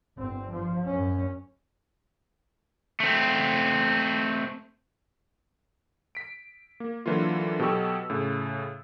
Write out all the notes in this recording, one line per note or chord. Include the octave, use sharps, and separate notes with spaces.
G1 C4
F3
F#2 C#4
A3 C4
B6 D7
A#3
D3 E3 F#3 A#3 F4
B2 F#3 G4 A4 C#6 E6
A2 C#3